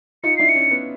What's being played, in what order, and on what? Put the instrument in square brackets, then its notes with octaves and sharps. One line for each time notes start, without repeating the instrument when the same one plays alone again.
[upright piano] D#4 F4 [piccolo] C#7
[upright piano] D4 E4 [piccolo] C7
[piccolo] C#7
[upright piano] C#4 D#4
B3 C#4